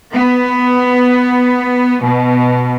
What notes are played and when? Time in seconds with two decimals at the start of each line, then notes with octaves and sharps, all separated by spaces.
0.13 B3
2.03 B2